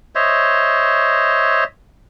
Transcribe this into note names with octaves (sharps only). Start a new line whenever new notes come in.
C5 C#5 D#5 E5